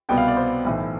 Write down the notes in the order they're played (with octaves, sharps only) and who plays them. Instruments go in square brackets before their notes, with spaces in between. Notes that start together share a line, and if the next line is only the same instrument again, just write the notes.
[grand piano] C2 B2 G3 B3 G5
F5
D5
C5
B1 A2 E3